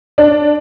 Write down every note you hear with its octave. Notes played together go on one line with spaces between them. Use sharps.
D4